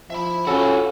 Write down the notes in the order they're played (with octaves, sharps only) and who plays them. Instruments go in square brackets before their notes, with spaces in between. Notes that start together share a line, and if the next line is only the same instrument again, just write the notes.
[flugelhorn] F3 [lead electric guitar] E5 B5
[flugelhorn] C#4 [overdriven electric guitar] F4 F#4 [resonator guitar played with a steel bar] A4